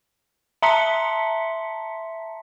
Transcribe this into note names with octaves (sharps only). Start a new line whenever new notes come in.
E5 A5 A#5 C6 B6 C#7